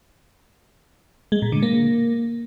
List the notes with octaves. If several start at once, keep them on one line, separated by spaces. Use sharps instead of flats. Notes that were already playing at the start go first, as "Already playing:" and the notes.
G#3
A#2
D3
A#3